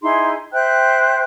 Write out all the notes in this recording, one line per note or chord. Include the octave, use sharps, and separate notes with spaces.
D#4 E4 G#4 C6
C5 E5 G5 F#6